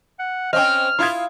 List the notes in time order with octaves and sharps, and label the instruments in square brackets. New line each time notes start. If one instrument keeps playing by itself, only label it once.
[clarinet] F#5
[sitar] C4 C#4 [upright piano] D#5 G5 [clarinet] F6
[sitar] E4 F4 [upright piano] C6 D#6 G#6